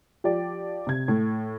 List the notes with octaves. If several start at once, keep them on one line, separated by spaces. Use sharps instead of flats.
F3 G4 D5
C3 G#6
A2